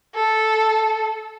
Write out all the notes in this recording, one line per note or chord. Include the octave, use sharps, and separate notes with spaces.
A4